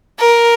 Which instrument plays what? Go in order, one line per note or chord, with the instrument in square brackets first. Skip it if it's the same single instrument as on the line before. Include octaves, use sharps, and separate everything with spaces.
[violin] A#4